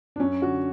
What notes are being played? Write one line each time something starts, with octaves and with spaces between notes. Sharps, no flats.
D4
F#2 C#4
D3 F#4